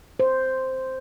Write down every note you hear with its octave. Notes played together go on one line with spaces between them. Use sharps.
C5